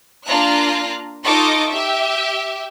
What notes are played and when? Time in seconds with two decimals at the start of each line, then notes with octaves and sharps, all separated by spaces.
0.25 A#3 D4 F4 F5 A#5 F#6
1.24 D#4 F4 A4 D#5 C#6 D6
1.69 G4 E5